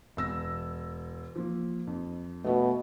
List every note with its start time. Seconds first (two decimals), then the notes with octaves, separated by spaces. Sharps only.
0.17 E1 E6 A#6
1.36 F3 A#3
1.87 F2
2.44 B2 A3 B3